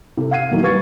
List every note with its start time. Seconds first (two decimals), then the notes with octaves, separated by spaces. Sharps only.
0.17 C3 A4
0.31 F5 F#5 G#6 C7 D#7
0.51 A#2 D#3 E3 F#3 A3 A#3
0.63 G3 B4 C#6 G#6 A6 C#7